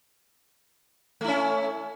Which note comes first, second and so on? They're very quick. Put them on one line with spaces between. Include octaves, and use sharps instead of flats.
A3 E4 C#4